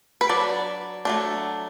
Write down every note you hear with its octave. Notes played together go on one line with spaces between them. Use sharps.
B4
F#3 D4 D5
F#3 A3 D4